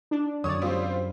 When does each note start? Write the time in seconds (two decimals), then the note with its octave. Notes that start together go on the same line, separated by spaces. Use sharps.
0.11 D4
0.44 F#2 D3 C#5 D5 D#6
0.62 G3 C4 F4